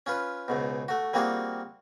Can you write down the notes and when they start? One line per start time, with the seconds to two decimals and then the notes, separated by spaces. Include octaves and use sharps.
0.06 C#4 F4 B4
0.48 C#2 G#2 B2
0.88 A3 F#4
1.13 G3 A#3 C4 F4 F#4 G#4